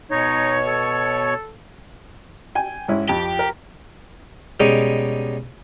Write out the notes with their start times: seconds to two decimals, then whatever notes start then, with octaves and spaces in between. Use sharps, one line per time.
0.11 B2 D#4 C#5
0.67 A4
2.55 G5 G#5
2.88 G#2 C#4 E4
3.09 F2 G4
3.39 A#4
4.60 B2 G3 G#3 C#4 D#4 G4